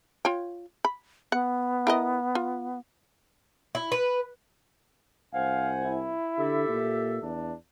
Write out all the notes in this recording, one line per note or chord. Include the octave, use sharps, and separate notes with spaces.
F4 C#5 G5
B5
B3 F#5
E4 A#4 D#5
F4
E4
B4
C2 C5 F5 F#5 G#5
E4
D3 G4 A4 E5
A#2
E2 D4